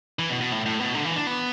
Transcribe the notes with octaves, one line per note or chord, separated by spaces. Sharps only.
E3
B2
B2
A2
A2
B2
D3
E3
D4
B3